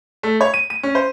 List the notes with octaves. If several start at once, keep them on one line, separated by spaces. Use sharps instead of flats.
A3
C#5
D#7
D#7
C#4
C5